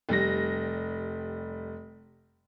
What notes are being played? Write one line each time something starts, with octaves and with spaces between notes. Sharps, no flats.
F1 G3 A#6